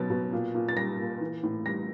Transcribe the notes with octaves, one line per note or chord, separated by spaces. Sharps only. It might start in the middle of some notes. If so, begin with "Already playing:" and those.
Already playing: B2 F#3 A6
B2
A#2
A#2
A6
G3 A#6
A#2
E3
A2
G3 A#6